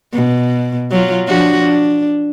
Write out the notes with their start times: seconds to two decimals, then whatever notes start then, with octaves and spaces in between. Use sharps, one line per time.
0.13 B2
0.91 F#3 F4
1.28 F3 D4 F#4
1.60 D4